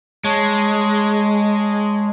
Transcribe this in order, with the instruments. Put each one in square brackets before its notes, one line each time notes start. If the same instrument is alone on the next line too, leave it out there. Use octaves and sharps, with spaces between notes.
[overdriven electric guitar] G#3 [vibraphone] C#5 A5 C#6